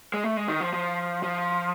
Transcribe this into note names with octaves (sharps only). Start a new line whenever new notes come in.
G#3
A3
G#3
D#3
F3
F3
F3